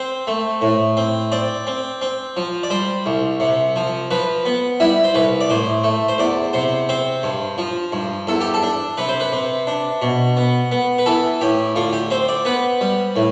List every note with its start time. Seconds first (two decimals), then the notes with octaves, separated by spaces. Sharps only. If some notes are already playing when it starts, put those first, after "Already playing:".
Already playing: C4 C5
0.27 A3
0.61 A2
0.97 C4
1.32 C4 D5
1.67 C4
2.01 C4
2.37 F3
2.63 D5
2.70 G3 C5
3.06 C2
3.40 C3
3.76 F3
4.11 F3 B4
4.46 B3
4.80 G3 E4
5.04 C5
5.15 C2 B4
5.41 D5
5.50 A2 C5
5.84 A3
6.08 C5
6.18 E2 D5
6.53 C3 C5
6.89 C4 C5
7.23 G2
7.58 F3
7.92 G2
8.27 E2 A4
8.41 G4
8.54 A4
8.63 D4
8.97 C3 B4
9.09 C5
9.20 B4
9.32 C3
9.67 D4
10.02 B2
10.37 B3
10.71 B3
10.98 B4
11.06 E3 A4
11.41 A2 G4
11.76 D3 F4
11.93 G4
12.11 C4 C5
12.29 D5
12.45 B3 B4
12.81 G3
13.16 A2